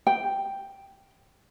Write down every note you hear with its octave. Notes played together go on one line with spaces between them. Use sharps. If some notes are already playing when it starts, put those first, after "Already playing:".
G5